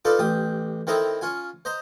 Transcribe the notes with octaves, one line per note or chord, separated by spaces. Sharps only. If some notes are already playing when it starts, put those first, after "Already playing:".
D#4 F4 A4 B4 D5
A1 G4 D#6
D#3 C4 E4 A4 A#5 D#6
C#4 F4 G#5
C5 D#5 A#5